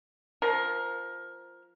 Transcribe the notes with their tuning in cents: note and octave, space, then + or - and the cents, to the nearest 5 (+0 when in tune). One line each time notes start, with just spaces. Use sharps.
F3 +0 A#4 +15